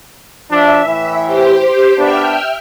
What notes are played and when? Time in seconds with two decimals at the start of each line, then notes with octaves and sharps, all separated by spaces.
0.51 F3 D4 E5
0.84 A2 E3
1.26 G4 C5
1.98 B3 D4 E5 G5 F6